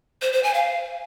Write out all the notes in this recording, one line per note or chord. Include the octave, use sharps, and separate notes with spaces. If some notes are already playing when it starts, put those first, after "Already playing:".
C5
C5
G#5
F5